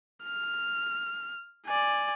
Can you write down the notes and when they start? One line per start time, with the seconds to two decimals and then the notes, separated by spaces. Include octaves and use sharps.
0.24 F6
1.66 D5 G#5